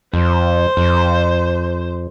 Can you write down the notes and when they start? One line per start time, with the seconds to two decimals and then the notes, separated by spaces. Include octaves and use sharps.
0.13 F2 C5
0.77 F2